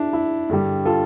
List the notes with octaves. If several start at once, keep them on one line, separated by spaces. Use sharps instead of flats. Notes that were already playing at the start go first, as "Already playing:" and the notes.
Already playing: D4 E4
E4
G2 D3 G3
F4 A4